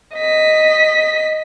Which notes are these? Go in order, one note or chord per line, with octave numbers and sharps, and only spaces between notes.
D#5 B6